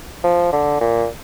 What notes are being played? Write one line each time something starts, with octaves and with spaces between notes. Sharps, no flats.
F3
D3
A#2